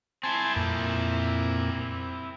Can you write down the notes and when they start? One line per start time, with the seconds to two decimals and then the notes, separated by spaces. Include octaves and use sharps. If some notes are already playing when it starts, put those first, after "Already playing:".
0.23 C4 E4 G#5 A5 C6
0.56 F2 A#2